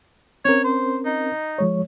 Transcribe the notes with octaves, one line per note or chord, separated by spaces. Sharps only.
C4 C#4 A#4 C#5
C5
D#4
F3 G#3 C#5